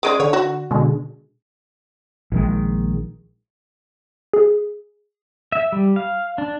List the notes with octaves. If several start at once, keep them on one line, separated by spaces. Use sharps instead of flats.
C#3 G#3 D5 D6 D#6
D3 D4 C#5
F#4
B2 D3 G#3
A#1 D#3 G#3
G#4
E5
G3
F5
D4